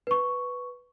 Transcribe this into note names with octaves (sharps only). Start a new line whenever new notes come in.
B4 C#6